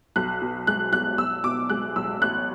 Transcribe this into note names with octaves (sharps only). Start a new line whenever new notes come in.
B1 F#6
B2
G#3 F#6
B1 F#6
B1 E6
B2 D6
G#3 F#6
B1 E6
A1 F#6